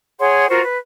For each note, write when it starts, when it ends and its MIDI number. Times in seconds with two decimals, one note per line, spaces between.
0.19 0.46 68
0.19 0.46 73
0.19 0.46 78
0.19 0.46 84
0.49 0.61 65
0.49 0.61 66
0.49 0.61 70
0.49 0.61 72
0.62 0.77 71